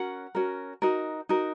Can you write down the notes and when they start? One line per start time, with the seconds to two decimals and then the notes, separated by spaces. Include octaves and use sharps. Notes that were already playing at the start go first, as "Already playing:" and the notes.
Already playing: C#4 F#4 A#4 F#5
0.35 C#4 F#4 A#4
0.82 D#4 F#4 A#4
1.29 D#4 F#4 A#4